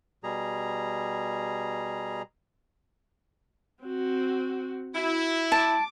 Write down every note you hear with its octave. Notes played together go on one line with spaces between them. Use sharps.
B2 G3 G#4 A#5
C4 F#4
E4 F#4
A5 D6